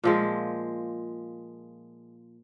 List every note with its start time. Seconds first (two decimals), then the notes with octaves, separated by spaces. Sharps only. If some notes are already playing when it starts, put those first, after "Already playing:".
0.04 A#2 F3 G#3